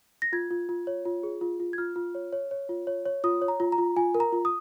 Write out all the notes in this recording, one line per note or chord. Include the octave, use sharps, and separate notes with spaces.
A#6
F4 G#6
F4
F4
C#5
F4
G#4
F4
F4
G#6
F4 F6
F4
C#5
C#5
C#5
F4
C#5
C#5
F4 D#6
C#5
A#5
F4
A#5
F4
F4 G#5
A#4
A#5
F4
D#6